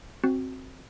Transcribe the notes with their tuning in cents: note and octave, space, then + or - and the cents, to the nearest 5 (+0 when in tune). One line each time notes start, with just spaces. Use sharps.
C4 +10 F#4 +0